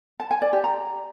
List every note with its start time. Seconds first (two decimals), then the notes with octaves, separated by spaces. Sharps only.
0.20 A5
0.31 G#5
0.42 D5
0.53 G4
0.64 A#5